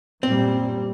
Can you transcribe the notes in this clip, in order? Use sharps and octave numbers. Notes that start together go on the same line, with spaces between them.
F#2 A#2 G3 C4